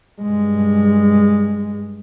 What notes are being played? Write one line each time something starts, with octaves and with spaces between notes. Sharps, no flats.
G2 G#3